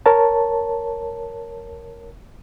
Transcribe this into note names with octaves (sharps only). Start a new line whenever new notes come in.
A#4 C#5 A5